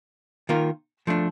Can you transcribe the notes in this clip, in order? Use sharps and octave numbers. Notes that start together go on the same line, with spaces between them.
D#3 A#3 F4 A#4
F3 A3 D4